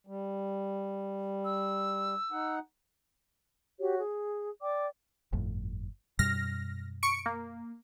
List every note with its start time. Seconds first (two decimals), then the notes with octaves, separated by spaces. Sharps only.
0.07 G3
1.45 E6
2.32 D#4 F#5
3.79 F#4 G4 C#5
3.99 G#4
4.62 D5 G5 D6
5.33 G1 F2 A2
6.19 F#2 B2 G3 F6 A#6
7.03 C#6 C#7 D7
7.26 A#3